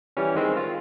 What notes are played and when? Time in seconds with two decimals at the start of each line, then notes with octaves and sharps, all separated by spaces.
0.17 E3 G3 C#4
0.35 D#3 G#3 C4
0.57 F4